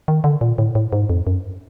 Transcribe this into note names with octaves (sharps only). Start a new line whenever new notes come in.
D#3
D3
A#2
A2
A2
G#2
F2
F#2